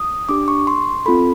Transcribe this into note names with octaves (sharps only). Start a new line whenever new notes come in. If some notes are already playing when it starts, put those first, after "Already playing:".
Already playing: D#6
D4 G4 D6
C#6
C6
C4 F4 A4 B5